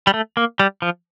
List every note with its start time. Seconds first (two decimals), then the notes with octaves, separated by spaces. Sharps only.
0.07 G3
0.14 A3
0.37 A#3
0.60 G3
0.82 F3